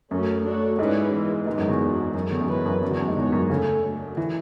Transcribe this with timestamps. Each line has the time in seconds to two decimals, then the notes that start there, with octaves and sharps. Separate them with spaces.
0.11 F#2 F#3 A3 C#4
0.45 A3 D4 F#4 A4 C#5
0.79 G#2 C#4 E4 G#4 B4 D5
1.12 E3 G#3 B3
1.46 G#2 E3 G#3 B3
1.58 F#2
1.69 E2
1.80 G#3 D4 F#4
2.14 F#2 A3 C#4 G#4
2.31 E2
2.41 F#2
2.48 E2 G#3 C#4 E4 B4
2.65 F#2
2.82 F#2 B3 D4 F#4
2.91 E2
3.00 F#2
3.08 G#2
3.17 E2 B3 F#4 C#5
3.32 F#2
3.49 C#3 A3 D4 A4 C#5
3.84 F#3 A3 D4
4.17 E3